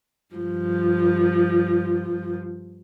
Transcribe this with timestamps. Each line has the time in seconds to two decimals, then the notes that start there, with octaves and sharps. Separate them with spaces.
0.34 G2 F3